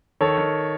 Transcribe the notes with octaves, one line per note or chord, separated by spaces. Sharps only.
D#3 A4 C#5
D#3